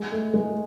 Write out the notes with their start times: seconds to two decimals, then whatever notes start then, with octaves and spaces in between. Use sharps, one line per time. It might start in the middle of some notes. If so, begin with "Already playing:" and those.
Already playing: G#3
0.12 A3
0.34 G#3